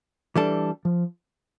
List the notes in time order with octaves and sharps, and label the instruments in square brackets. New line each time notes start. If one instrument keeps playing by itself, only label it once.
[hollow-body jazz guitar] E3 G3 D4 A4
[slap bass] F3